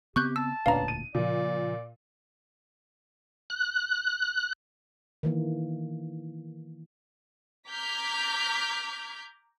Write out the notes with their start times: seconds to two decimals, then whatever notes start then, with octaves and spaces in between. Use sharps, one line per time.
0.16 C#3 B3 C4 G4 C#6 F#6 G6
0.36 A5 E6
0.66 E1 D2 A#2 B3 C#4 D4 F5 A#5
0.88 D#7
1.15 A#2 C#3 F3 D5
3.50 F#6
5.23 D#3 E3 A#3
7.69 A#5 D6 F6 G6 G#6 B6